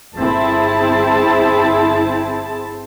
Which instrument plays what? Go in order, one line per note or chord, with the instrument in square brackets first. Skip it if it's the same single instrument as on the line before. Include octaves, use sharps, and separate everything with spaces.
[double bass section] G1 C4 [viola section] E4 G#4 A5